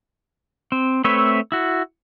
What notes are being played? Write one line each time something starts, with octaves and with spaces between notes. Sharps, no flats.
C4
A3 C4 B4 C#5 E5
E4 F#4